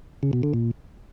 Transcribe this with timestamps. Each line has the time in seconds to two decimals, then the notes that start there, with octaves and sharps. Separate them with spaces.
0.23 C#3
0.33 B2
0.43 D3
0.54 A#2